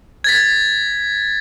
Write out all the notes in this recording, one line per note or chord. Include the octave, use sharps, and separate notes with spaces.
G#6 A6 B6